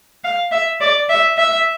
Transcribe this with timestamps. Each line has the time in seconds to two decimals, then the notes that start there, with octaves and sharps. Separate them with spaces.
0.24 F5
0.51 E5
0.81 D5
1.09 E5
1.37 E5